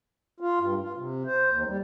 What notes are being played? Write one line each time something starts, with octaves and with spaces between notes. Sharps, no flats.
F4
G2
F4
C3
C5
D#2
G3